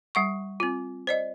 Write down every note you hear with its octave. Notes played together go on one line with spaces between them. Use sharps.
G3 F#5 C#6
C4 F4
C5 D5 D#5